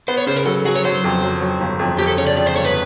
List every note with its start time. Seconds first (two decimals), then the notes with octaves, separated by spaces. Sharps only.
0.08 B3 C5
0.18 C#5
0.27 C#3 C5
0.36 A#4
0.46 F#3 A4
0.65 F#3 G#4
0.75 C#5
0.85 F#3 C5
1.04 F2
1.23 F#3
1.41 F#3
1.60 G1
1.79 F2
1.98 F2 G4
2.07 A4
2.17 C#3 C#5
2.27 D5
2.37 F2 D5
2.46 C5
2.56 G1 C#5
2.65 B4